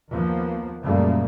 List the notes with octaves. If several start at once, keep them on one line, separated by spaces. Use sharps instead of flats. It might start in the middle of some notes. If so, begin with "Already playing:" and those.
D#2 F3 A#3 B3
F#2 A#2 C#3 G3 A3 A#3